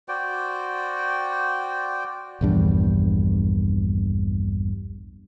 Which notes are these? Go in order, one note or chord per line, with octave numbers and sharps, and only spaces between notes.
F#4 C5 D5 G5
A#1 E2 G2